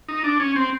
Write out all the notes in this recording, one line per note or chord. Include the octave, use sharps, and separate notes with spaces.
D#4
D4
C#4
C4